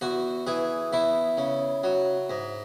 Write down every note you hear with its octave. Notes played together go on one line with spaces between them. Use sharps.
E2 F#4
E3 G#4
E2 E4
C#3
F#3
G#2